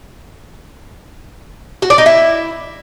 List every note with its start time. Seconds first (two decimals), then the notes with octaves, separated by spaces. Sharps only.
1.82 F#4
1.90 D5
1.98 D#4
2.06 E4